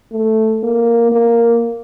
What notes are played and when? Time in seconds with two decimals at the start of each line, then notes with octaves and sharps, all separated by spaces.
0.12 A3
0.63 A#3
1.12 A#3